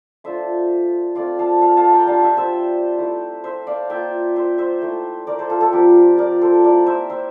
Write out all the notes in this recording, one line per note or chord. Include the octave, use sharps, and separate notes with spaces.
A3 D4 F4 C5 E5
A3 C4 F4 D5 F5
F5 A5
F5 A5
F5 A5
G5 A#5
G3 D4 F4 F5 A5
E5 G5
C5 E5
A3 E4
C5 E5
D5 F5
A#3 F4 E5 G5
C5 E5
C5 E5
A3 E4
A#4 D5
A4 C5
F4 A4
F4 A4
F3 C4 F4 G4 A#4
A#4 D5
A4 C5
A#3 E4 A#4 D5
C5 E5
C5 E5